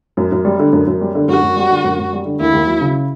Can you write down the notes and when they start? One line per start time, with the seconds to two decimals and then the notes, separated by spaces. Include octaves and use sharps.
0.17 F#2
0.32 F#2
0.45 G3
0.59 D3
0.73 F#2
0.87 F#2
1.01 G3
1.15 D3
1.28 F#2 F#4
1.42 F#2
1.56 G3
1.70 D3
1.84 F#2
1.99 F#2
2.13 G3
2.25 D3
2.40 D#2 E4
2.53 D#2
2.67 F#3
2.81 C#3